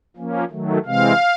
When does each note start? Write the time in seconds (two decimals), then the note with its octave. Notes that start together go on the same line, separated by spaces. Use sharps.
0.17 F3 A#3 C#4
0.50 D#3 F#3 A3
0.85 C3 E3 G#3 C4 F5